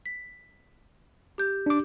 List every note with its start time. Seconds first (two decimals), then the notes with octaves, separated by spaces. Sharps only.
0.06 B6
1.38 G4 G6
1.66 D4 D6